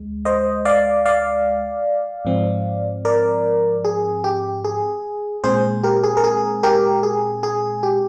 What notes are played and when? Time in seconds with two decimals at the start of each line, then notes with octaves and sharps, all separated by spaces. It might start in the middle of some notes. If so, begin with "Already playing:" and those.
Already playing: D2 G#3
0.25 C5 D#5
0.65 D5 F5
1.05 D5 F5
2.25 G#2 F3 C4
3.05 A#4 D5
3.85 G#4
4.24 G4
4.64 G#4
5.44 A#2 G#3 C4 G#4 C5
5.83 G4 A#4
6.03 G#4
6.17 A#4
6.24 G#4
6.63 G4 A#4
7.03 G#4
7.43 G#4
7.83 G4